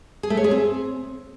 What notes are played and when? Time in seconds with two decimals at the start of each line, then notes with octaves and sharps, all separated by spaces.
0.23 G#4
0.30 A3
0.37 C#5
0.44 G#4
0.51 C4